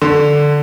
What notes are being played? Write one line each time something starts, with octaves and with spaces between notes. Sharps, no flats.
D3